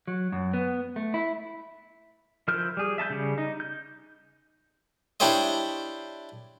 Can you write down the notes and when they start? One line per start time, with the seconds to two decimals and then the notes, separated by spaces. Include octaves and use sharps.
0.08 F#3
0.32 F#2
0.54 B3
0.96 A3
1.14 E4
2.48 F3 E4 A#4 F6 G6
2.77 G3 G#4
2.98 E5 A5 A#5 G6
3.10 C#3 G3
3.38 D#4
3.60 G6
5.20 D4 E4 G4 C5 C#5 D#5